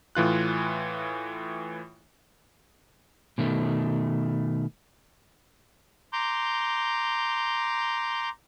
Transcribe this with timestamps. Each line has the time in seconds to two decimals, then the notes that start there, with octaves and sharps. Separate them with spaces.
0.15 A2 E3 F4 F#6
3.38 B2 D#3 A3
6.13 A#5 C6 D6 G6